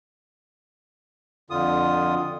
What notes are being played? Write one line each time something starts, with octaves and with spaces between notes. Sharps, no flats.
F2 D3 F4 D#6